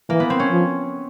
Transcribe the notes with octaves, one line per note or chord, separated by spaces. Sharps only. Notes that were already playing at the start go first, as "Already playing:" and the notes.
E3 A#3
B3
C4
C#4
F3